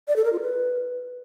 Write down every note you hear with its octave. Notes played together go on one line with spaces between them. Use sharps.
D5
A4
A#4
F4
B4